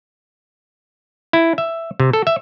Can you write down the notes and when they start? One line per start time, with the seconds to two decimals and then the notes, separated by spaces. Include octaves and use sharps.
1.33 E4
1.58 E5
2.00 C3
2.13 A4
2.27 E5